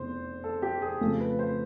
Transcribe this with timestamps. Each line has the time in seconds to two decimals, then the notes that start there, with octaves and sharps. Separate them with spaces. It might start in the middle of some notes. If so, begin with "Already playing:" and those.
Already playing: F1 E2 C5
0.44 A4
0.62 G4
0.82 G#4
1.00 F2 C#3 F3 A3 A4
1.20 B4
1.39 C5